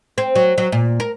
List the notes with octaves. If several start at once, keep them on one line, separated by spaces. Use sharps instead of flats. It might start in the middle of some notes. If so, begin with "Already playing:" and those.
C4
F#3
F#3
A#2
A#4